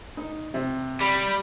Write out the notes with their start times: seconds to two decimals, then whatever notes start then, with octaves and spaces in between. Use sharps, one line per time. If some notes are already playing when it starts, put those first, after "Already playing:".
0.17 D#4
0.54 C3
1.01 G3 B5